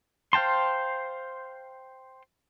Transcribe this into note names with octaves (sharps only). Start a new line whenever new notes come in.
C5 F5 G5 A5 C6